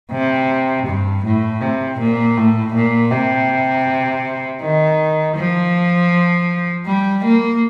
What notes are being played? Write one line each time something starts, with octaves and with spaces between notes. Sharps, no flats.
C3
G2
A2
C3
A#2
A2
A#2
C3
D#3
F3
G3
A#3